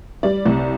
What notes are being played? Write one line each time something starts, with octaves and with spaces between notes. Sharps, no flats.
G3 D5
C2